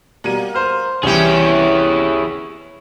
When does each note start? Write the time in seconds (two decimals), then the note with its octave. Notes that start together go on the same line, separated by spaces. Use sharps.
0.24 B2 G3 A#3 D#7
0.54 C5 F6
1.03 C2 E3 C#4 E4 G4 G#4